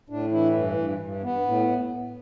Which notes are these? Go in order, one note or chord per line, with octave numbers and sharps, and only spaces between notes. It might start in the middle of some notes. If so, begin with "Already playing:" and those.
A2 D4
E3 E4
G2
G2
G2
B3
A2